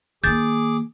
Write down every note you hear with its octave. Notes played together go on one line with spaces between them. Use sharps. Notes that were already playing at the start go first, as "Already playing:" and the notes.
D#3 A#3 G#4 D6 G6 A6